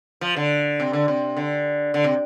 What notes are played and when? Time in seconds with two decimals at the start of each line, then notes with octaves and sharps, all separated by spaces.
0.21 F3
0.36 D3
0.80 C3
0.93 D3
1.08 C3
1.37 D3
1.94 D3
2.04 C3